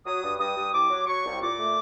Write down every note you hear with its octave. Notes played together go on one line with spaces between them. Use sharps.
F#3 D#6
G2
G2 D#6
G2
C2 D6
F#3
F#3 C#6
C2
A#2 D6
A3